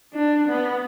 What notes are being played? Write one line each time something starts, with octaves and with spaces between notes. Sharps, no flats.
D4
B3